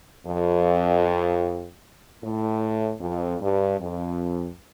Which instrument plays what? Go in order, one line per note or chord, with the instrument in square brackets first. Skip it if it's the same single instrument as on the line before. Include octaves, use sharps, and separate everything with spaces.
[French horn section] F2
A2
F2
G2
F2